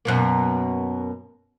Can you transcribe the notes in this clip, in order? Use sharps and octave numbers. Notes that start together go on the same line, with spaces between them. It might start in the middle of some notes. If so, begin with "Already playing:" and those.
F#2 B2 A#3